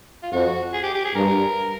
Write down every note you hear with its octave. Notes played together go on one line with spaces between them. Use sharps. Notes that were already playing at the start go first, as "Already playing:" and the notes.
F4
F2 F#4
G#4
G4
G4
G#4
G2 A#4